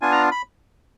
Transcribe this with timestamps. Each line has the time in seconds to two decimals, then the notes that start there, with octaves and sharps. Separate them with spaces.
0.01 B3 D4 F4 G#5
0.12 A#5
0.31 B5